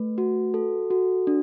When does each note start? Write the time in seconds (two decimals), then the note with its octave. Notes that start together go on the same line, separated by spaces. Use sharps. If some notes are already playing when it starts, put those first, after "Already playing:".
Already playing: A3 B4
0.18 F#4
0.54 A4
0.90 F#4
1.27 D4